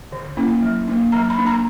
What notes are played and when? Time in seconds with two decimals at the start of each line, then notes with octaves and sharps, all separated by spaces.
0.12 D3
0.37 A#3 C#4 E4
0.63 F#3
0.88 A#3 D4
1.12 F#3 A#5
1.30 B5
1.39 A#3 D4
1.47 A#5